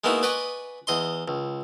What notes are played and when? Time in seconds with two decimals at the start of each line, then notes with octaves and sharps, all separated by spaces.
0.04 G#3 A#3 B3 D#4 E4 F#4
0.23 B4 D5 D#5 F#5 G#5 C#6
0.87 E2 D#5 C6
1.28 C#2